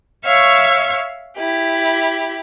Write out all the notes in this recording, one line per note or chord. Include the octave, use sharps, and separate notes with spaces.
C#5 E5 F5 C#6
E4 G4